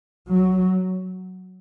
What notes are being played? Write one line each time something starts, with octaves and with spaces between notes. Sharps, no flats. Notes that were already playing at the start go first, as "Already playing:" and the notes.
F#3